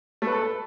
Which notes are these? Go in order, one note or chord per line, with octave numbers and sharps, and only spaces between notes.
A3
B4
A4